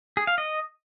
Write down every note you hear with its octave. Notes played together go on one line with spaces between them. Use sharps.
G#4
F5
D#5